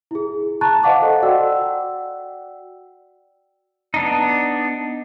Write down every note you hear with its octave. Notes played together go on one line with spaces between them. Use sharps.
E4 G#4
A5 A#5 C#6 F#6 A6
C5 D#5 F5 F#5 A5 D6
A4 F#5
F#4 D5 F#5 G5 E6
B3 D4 D#4